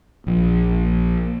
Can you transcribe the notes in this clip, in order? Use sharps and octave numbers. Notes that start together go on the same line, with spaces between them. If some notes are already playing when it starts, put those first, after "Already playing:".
A#1